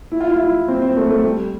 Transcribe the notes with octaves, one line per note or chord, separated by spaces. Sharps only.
E4
F4
E4
F4
E4
C4
C4
A3
A3
G3